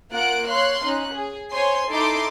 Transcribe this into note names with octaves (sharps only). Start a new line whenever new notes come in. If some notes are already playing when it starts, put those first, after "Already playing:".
A#3 F4 F#5 F#6 D7
C#5 F5 C6 F#6
C#4 D#4 F#6
G#4
C5 C#5 G#5 C6
D#4 E4 A4 C6 D6